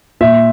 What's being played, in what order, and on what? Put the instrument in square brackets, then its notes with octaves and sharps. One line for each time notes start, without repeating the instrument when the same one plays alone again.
[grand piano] A#2 E5